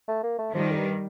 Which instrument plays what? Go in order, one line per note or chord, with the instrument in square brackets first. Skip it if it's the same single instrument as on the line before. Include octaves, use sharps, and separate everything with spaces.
[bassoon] A3
A#3
A3
[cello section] D#3 G3 [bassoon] F3
[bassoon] F2
G2